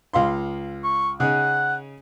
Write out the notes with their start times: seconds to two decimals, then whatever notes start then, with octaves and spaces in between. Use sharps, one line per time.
0.13 C#2 F5 C6
0.83 C#6
1.20 C#3 C#4 D#4 F#5